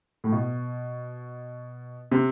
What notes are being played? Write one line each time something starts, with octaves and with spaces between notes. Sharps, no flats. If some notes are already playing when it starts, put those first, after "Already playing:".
A2
B2
C3